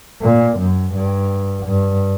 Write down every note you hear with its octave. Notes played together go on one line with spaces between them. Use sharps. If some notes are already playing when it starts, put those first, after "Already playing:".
A#2
F#2
G2
G2